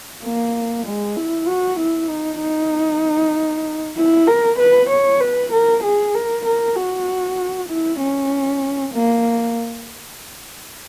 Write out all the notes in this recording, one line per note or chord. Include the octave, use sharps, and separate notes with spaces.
A#3
G#3
E4
F#4
E4
D#4
D#4
E4
A#4
B4
C#5
B4
A#4
G#4
A#4
A#4
F#4
E4
C#4
A#3